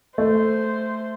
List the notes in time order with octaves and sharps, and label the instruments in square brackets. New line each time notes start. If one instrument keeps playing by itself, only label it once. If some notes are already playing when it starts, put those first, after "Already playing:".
[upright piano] A3 [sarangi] C5